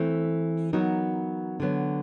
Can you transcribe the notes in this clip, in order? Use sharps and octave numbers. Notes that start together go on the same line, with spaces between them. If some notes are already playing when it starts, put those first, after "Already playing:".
Already playing: E3 A3 C4
F#3 B3 D#4 F#4 A#4
D3 F#3 B3